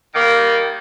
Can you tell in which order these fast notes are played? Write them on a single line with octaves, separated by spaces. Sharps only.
D#3 A#3 G3